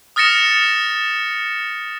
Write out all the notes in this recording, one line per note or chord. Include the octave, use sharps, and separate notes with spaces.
D#6 F6 A6 A#6 C#7 E7